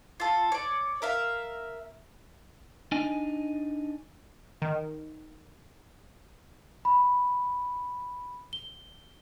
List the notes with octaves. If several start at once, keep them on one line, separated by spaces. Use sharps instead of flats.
F4 A4
C#5 D5
A#4 E5 F5
D4 D#4 D#5 G#5
D#3
B5
G7